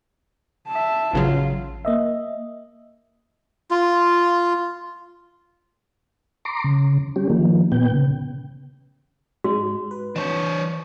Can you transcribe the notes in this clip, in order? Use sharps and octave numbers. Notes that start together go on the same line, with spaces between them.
E5 A5
A1 C#3 F#3 F4
A#3 D#5 E5
F4
A#5 C6 D6
C#3
G3 C#4 G4
D#3 F3 A#3
A#2 B3 G5
C#3
G#2 G#3 F#4
B4
E3 D4 C5 C#5 A5